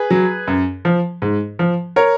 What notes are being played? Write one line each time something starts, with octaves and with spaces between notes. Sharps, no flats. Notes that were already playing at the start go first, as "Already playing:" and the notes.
Already playing: G#4 B4
F#3
F#2
F3
G#2
F3
A#4 C#5